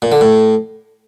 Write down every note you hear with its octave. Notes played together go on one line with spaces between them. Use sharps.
A#2
D3
A2